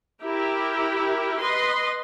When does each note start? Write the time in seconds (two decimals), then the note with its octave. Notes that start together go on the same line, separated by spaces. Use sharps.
0.22 E4 G4 A#4
1.40 B4 D#5 C6